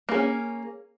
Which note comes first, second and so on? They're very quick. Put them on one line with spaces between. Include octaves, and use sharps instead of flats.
A#3 G#4 C#4